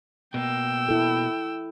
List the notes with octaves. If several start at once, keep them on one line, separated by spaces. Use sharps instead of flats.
B2 A#3 G5 E6
E4 A4